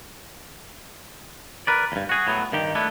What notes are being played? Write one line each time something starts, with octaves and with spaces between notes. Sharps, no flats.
A#4 B4 D5
E2 G2
F#4 G#4
A2 F#3 B3
G2 D#3 G4
A3 B3 D4 E4